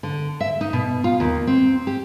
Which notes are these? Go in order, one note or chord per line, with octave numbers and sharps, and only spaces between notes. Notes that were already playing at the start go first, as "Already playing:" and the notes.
D3
E5
D#4
B2
F4
D#2
C4
G4